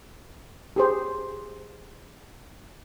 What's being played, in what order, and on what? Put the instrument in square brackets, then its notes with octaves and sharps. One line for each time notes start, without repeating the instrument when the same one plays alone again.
[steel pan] G4 G#4 C5